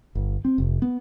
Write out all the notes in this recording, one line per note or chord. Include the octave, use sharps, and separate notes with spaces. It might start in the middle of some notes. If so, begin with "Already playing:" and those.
G1
C4
F1
B3